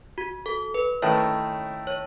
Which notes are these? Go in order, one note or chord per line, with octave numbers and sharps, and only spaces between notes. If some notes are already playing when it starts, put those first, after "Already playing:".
F#4
A4
B4
D#3 A3 E4 C#5
C#5